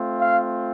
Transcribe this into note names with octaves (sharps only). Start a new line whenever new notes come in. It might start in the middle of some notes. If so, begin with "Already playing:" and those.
Already playing: A3 C4 F4
F5